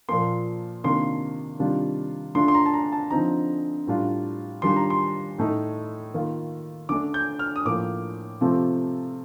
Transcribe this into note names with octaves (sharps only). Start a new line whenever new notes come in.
A#2 F3 A#3 C6
C3 D#3 A#3 D4 F4 C6
C3 D#3 G3 D4 F4
D3 A3 D4 F4 C6
C6
A#5
A5
A#5
A5
D3 F3 C4 D#4 A#5
A2 G3 D4 F4
D#3 G3 D4 F4 C6
A#5
C6
A2 A3 D#4
D#3 A#3 F4
D3 A3 D4 D6
G6
F6
D#6
A2 F3 A#3 D6
C3 F3 A3 C4 F4